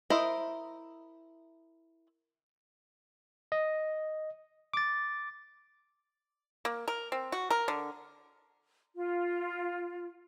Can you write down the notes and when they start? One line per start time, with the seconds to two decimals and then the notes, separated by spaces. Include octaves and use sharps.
0.10 E4 A#4 C5 D#5
3.52 D#5
4.73 D6 A6
6.65 A#3
6.88 A#4
7.12 C4
7.32 F#4
7.50 A#4
7.68 D3
8.95 F4